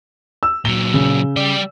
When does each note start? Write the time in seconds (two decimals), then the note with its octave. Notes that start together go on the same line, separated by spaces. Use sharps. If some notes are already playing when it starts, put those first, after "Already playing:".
0.43 E6
0.65 A#2 F#3 G7
0.94 C#3
1.36 G3 D5